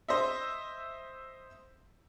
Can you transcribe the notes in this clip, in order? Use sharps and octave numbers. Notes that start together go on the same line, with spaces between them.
C5 D#5 E5